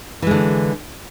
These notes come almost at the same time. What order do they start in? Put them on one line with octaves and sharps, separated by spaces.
E3 G#3 D3